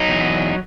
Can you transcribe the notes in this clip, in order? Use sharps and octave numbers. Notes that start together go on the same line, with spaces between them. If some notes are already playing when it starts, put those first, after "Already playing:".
Already playing: F#3 D#4
E2